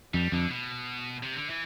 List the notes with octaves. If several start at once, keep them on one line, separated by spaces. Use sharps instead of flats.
F2 G3
F2 D3
B2
C3
D3
E3